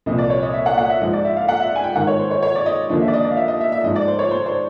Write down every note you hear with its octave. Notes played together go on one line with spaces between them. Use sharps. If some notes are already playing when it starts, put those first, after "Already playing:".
C2 A#2 F3 D#5
D5
C#5
D#5
E5
F#5
F#5
E5
G#2 F3 D#5
D5
E5
F5
F#5
E5
G#5
G5
G#2 D#3 F#5
C#5
C5
C#5
C#5
D5
D#5
D#2 D3 F3 D#5
E5
D5
D#5
D5
F5
E5
D#5
E5
E5
G#2 F3 D#5
D5
C5
C#5
C5
C5